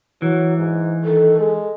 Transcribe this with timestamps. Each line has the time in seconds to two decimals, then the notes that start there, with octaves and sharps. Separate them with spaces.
0.22 E3 F#3
0.57 G#2
1.04 D#3 A4
1.39 G#3